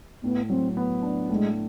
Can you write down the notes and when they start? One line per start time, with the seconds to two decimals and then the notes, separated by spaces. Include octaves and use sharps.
0.23 A2 B3
0.49 F#3 C4
0.77 B3
1.03 D4
1.30 A2 G#3